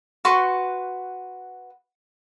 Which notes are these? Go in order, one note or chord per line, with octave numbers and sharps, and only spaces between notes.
F#4 B4 C6 C#6